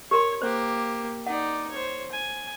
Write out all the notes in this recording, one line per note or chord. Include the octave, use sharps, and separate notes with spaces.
G4 A#4 C#5 C6
A#3 G4 C5
D#4 D5 F#5
C5 C#5
G#5